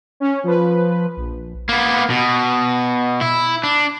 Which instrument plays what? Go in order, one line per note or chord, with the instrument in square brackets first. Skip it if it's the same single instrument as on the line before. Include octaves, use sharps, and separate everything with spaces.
[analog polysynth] C#4
F3 B4
A#1
[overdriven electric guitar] A#3 B3
B2
E4
D4